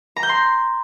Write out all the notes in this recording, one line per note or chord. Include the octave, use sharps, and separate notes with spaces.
A#5
G6
C6